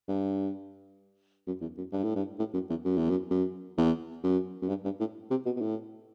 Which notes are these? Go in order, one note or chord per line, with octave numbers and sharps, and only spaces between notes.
G2
F#2
E2
F#2
G2
A2
G2
A2
F#2
E2
F#2
E2
F#2
F#2
E2
F#2
F#2
G2
G2
A2
C3
B2
B2
A2